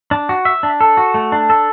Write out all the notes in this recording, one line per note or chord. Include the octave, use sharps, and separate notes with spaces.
D4
F#4
E5
D4
A4
F#4
A3
D4
A4